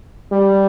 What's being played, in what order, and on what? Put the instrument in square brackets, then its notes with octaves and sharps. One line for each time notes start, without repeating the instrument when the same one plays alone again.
[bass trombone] G3